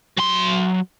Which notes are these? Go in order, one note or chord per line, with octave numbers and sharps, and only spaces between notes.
F#3 C6